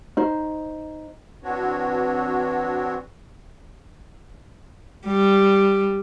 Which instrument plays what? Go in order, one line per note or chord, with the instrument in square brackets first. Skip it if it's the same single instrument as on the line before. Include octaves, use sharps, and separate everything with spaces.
[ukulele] D#4 C5
[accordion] E3 C4 D4 F#4 C#5
[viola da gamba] G3